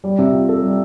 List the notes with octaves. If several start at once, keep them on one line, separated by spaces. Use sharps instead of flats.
G3
C3
F4
A4
G3